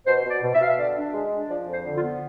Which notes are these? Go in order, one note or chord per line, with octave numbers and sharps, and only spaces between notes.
B2 C5
B2
D5
B2
E5
B2 F5
E5
D3 D5
D4
G#3
D4
F3 D5
F2
C5
D3
F4
B3